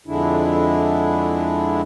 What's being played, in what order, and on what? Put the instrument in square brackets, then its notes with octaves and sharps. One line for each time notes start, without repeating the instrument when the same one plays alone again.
[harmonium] F2 D3 G#3 D4 E4